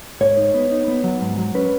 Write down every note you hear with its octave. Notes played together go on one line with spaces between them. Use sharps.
G#2 C#5
D#4
B3
D#4
B3
F#3
G#2
F#3
C#4 B4